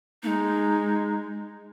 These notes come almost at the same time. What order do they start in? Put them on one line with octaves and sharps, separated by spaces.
A#3 D#4 G#3